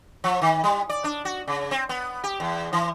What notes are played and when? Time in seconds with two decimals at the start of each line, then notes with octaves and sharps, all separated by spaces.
0.24 F3
0.42 D#3
0.64 G3
0.89 D5
1.04 D4
1.25 F#4
1.48 C#3
1.71 C4
1.89 B3
2.24 G4
2.40 E2
2.73 E3